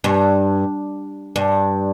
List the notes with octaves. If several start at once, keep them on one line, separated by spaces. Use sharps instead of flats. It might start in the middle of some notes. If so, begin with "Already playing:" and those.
G2
G2